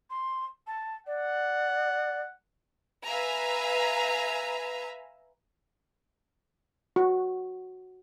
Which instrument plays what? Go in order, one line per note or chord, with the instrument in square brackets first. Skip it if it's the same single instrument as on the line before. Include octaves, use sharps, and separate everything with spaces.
[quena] C6
A5
[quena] D5 [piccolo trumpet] F#5
[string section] B4 E5 F5 G#5 A#5
[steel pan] F#4